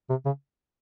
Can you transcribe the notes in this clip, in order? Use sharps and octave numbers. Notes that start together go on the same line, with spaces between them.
C3
C#3